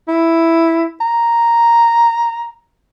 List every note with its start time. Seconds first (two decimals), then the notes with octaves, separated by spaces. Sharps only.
0.08 E4
1.01 A#5